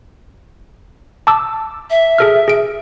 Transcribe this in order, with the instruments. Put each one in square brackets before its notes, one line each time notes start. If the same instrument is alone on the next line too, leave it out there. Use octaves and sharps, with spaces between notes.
[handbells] A5 D6 E6
[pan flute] E5
[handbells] G#4 A4 F6
G#4 D7